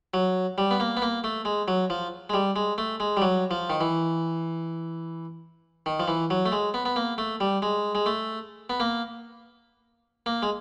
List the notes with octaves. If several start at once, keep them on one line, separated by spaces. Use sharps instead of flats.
F#3
G3
B3
A#3
B3
A#3
A3
G#3
F#3
F3
G#3
G3
G#3
A3
G#3
G3
F#3
F3
D#3
E3
D#3
F3
E3
F#3
A3
G#3
B3
B3
A#3
A3
G3
G#3
G#3
A3
B3
A#3
A#3
G#3